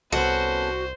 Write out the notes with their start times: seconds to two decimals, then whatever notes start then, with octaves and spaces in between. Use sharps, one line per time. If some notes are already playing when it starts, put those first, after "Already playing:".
0.12 C2 B3 C#4 F#4 A4 C5